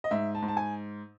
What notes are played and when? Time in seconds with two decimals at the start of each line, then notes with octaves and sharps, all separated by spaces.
0.04 D#5
0.11 G#2 E5
0.35 A5
0.42 G#2
0.48 A5
0.57 G#5